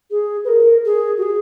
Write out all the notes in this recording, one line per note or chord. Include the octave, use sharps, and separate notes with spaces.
G#4
B4
A#4
G#4
F#4
G#4